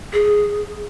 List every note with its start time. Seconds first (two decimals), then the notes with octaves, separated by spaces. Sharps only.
0.13 G#4